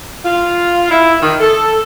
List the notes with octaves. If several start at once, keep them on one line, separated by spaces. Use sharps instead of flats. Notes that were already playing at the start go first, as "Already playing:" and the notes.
F4
E4
D#3
A4